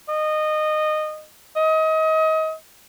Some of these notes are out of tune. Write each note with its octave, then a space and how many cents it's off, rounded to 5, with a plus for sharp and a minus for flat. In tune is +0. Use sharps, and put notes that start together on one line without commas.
D#5 -20
D#5 +30